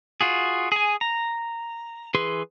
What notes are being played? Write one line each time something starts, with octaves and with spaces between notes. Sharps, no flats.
F4 F#4 G#4
G#4 G#5
A#5
E3 G#4 B4 C6